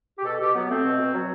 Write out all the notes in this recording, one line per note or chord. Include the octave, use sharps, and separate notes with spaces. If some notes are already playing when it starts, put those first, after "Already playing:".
G4
B2 A4
B2 G4
F#3 B3
A3 C4
B2
B2
F#3